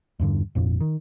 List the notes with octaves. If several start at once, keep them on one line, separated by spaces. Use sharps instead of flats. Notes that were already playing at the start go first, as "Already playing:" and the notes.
E2 G2 B2 D3
G#1 F2 A#2
D#3